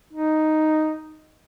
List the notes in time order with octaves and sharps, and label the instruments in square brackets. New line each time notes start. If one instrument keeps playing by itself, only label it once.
[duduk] D#4